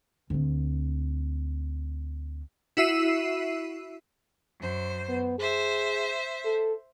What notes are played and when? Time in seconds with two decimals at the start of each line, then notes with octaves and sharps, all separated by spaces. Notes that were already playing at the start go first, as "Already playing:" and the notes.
0.30 D2 C4
2.77 E4 F#4 E5 E6 C7 D#7
4.58 F#2 C5
5.08 B3
5.39 G#4 C5 E5
6.45 A4